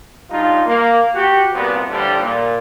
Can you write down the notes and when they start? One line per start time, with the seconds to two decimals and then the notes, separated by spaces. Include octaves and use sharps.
0.30 G2 D#4 F4
0.66 A#3
1.15 F#4 G4
1.53 C2 A#2 B3
1.90 A2 D3 F3 G3
2.20 A#2